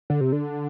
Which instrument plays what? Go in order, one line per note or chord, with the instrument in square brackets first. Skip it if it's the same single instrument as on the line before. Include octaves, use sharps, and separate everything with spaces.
[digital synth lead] D3
C3
D3